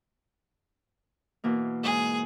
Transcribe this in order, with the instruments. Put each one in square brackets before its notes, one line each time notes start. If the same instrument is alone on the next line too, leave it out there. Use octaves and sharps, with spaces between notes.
[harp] B2 E3 A#3
[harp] G#2 [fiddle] G#4